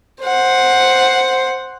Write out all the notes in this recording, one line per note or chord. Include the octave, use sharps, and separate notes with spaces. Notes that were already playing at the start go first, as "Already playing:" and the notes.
C5 F#5